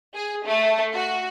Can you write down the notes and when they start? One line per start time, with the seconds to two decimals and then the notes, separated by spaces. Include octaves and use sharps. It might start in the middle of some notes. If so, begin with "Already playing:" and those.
0.15 G#4
0.46 A3
0.94 F#4